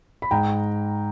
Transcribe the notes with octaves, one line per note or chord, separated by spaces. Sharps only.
B5
G#2 G5 A#5